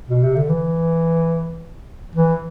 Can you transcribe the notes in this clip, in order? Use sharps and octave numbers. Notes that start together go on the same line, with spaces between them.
B2
C3
D3
E3
E3